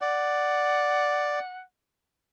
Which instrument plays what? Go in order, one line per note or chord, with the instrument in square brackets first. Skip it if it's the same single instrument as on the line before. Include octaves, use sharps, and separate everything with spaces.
[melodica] D5 [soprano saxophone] F#5